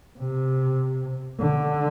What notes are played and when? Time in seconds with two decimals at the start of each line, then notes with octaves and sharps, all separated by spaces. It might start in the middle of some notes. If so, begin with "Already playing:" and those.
0.18 C3
1.40 D3